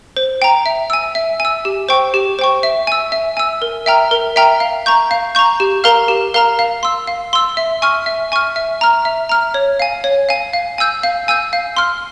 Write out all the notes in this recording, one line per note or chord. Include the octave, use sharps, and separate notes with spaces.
C5
G5 A#5
E5
G#5 E6
E5
G#5
E6
G4
C5 G5 C#6
G4
C5 G5 C#6
E5
G#5 E6
E5
G#5 E6
A#4
E5 G5 A#5 F6
A#4
E5 G5 A#5 F6
F5
A#5 C#6 G6
F5
A#5 C#6 G6
G4
A#4 F5 A#5 F6
G4
A#4 F5 A#5 F6
F5
C6 E6
F5
C6 E6
E5
G#5 C#6 F6
E5
G#5 C#6 F6
E5
A#5 F6
E5
A#5 F6
C#5
F5 G#5
C#5
F5 G#5
F5
G#5 E6 G6
F5
G#5 E6 G6
F5
C6 F6